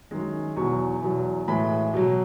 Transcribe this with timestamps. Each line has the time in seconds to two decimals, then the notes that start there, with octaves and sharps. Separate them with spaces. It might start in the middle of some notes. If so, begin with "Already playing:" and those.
0.11 F#2 D#3 G#3
0.56 E2 B2 F#3 C#6
1.02 E2 B2 F#3
1.48 A2 E3 G#3 B5
1.94 B2 F#3